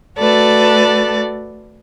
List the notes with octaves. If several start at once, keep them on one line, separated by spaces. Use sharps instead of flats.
A3 F#4 A4 B4 D5 A5